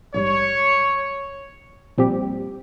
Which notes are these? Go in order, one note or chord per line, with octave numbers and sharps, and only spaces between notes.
A#1 G#2 G3 C#5
A#1 A#2 G3 C4 G4